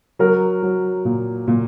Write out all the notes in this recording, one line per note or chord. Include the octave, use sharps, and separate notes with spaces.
F#3 A#4
F#3
A#2
A#2